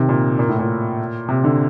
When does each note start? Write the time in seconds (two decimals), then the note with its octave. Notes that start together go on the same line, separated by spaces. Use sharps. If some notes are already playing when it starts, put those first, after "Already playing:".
Already playing: C3 D#3
0.09 A#2
0.39 A#2
0.49 A2
0.59 A#2
1.29 C3
1.44 D3